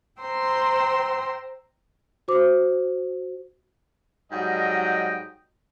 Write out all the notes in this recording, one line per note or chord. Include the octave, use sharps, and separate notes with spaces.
C5 G5 A#5 C6 E6
F#4 C5 D6
G#2 F#3 G3 D#5 G5